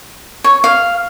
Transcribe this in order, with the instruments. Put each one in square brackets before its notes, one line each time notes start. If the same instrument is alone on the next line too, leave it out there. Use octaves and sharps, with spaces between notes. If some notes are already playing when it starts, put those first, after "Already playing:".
[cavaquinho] C#5
F5